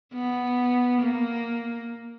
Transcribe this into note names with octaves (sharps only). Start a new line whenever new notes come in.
B3
A#3